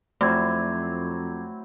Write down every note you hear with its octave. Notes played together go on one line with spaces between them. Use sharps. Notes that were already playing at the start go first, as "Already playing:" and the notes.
F2 F#3 A3 C4 E4 D6 G#6